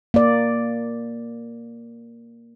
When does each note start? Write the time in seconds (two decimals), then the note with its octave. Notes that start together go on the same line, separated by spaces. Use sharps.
0.14 A#3 D5